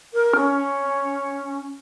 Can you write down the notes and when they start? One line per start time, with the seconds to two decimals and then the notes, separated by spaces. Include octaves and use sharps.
0.14 A#4
0.36 C#4